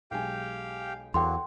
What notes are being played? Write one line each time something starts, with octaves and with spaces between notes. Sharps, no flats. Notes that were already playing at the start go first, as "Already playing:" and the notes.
B1 G#3 G4 F5 G5 G#5
E2 F#3 A#3 A4 F#5 G5 C6